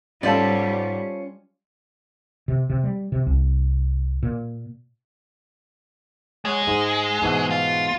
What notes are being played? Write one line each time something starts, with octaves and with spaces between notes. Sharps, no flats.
G#2 G3 C#4 F4 A4 C5 D5
C3
C3
G3
C3
C2
A#2
G#3 C#5 F#5
G#2
G#2 B2 E3
F4